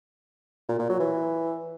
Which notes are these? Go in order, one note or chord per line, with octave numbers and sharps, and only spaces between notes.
A#2
A#2
F#3
E3